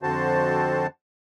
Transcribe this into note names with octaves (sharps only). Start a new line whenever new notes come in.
F2 D3 C4 F#4 C5 A5